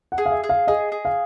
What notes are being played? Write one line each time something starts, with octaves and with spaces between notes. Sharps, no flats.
F#5
G#4
F5
E5
G#4
F5
G#4 D#5
G#4
F5